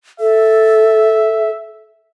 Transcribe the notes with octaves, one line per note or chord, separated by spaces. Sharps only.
A4 E5